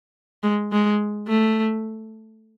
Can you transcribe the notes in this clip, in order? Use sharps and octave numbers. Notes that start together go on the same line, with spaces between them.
G#3
G#3
A3